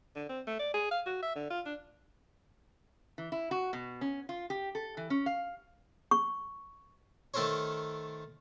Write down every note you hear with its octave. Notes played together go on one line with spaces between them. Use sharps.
D3
C4
A3
D5
G#4
F5
F#4
E5
D3
F4
D4
E3
E4
F#4
B2
C#4
F4
G4
A4
E3
C#4
F5
C#6
D#3 A3 A4 A#4 C5 C#5